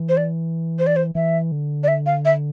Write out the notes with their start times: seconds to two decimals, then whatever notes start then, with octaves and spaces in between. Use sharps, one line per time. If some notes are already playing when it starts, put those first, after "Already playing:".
Already playing: E3
0.09 C5
0.17 D5
0.79 C5
0.87 D5
0.96 C5
1.15 E3 E5
1.52 D3
1.84 D5
1.88 E5
2.06 F5
2.25 E5